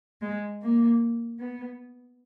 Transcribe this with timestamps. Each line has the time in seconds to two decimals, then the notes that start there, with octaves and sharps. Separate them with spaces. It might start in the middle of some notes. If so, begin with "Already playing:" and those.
0.22 G#3
0.61 A#3
1.39 B3